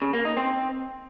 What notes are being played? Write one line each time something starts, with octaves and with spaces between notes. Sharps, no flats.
C#3
A#3
D#4
C4